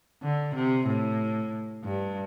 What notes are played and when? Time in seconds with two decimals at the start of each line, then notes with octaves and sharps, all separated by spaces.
0.23 D3
0.55 C3
0.87 A2
1.84 G2